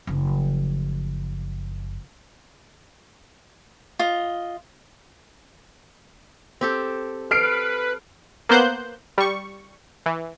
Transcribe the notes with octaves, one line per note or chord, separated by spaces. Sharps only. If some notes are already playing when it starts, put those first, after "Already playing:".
F#1 F3
F4 D#5
C4 G4 A4
A4 B4 F6 C7 D7
A#3 B3 C5 F#6 G6
G3 C#6
E3